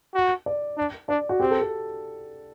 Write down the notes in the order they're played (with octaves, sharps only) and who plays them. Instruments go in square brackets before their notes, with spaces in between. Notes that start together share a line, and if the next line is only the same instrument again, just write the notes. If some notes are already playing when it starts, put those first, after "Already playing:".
[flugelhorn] F#4
[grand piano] D5
[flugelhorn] D4
[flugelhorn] D4 [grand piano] D5
[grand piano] F#4
[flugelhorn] C4 [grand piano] G4
[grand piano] A4
A4